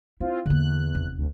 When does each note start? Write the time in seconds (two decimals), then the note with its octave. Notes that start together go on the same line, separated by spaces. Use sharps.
0.20 C4 E4 F4
0.46 E2 D3 A#3 F#6
0.95 F1
1.17 D2